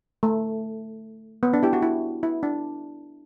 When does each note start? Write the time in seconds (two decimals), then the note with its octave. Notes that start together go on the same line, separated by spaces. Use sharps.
0.23 A3
1.43 B3
1.53 D4
1.63 E4 G4
1.73 F#4
1.82 E4
2.23 E4
2.43 D4